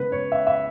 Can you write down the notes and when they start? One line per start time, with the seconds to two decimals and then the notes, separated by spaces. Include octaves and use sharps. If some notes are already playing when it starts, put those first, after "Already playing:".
Already playing: C#3 G#3 B3 B4
0.12 C#5
0.32 E5
0.47 E5